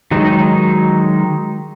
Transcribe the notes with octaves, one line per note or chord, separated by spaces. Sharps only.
D#3 F#3 G#3 D#4